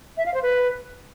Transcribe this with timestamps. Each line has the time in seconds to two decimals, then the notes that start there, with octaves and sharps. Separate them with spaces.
0.17 E5
0.26 F5
0.34 C5
0.42 B4